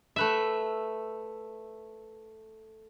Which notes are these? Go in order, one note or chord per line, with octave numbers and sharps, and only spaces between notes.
A3 B4 E5